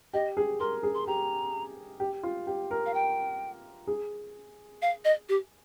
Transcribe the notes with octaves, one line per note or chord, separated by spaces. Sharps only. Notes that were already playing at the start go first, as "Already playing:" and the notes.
G4 D#5
G#4
A#4 C6
G#4
C6
G4 A#5
G4
F4
G4
A#4
F5
G5
G#4
F5
D#5
G4